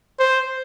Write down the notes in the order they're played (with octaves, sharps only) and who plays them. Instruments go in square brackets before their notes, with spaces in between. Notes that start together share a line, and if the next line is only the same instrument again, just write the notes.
[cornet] C5